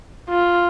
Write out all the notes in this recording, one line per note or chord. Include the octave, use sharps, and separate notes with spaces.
F4